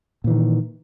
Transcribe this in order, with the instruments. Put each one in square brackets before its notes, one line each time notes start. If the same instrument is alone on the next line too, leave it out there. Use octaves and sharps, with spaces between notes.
[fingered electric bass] A#2
E3
D#3